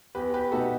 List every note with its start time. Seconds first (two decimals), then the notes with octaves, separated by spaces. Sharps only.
0.15 E2 G4 B4
0.34 G4 B4
0.51 B2 A3 D#4 F#4 A4